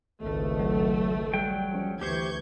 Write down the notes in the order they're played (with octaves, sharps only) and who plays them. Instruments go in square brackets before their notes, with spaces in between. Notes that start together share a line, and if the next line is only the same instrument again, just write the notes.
[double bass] G#1 C#2 [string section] A3
[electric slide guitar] F#3
F#3 G3 G5
[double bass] F3 C#4
[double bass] D2 E3 [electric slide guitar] G4 C5 [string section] C#6 G6 G#6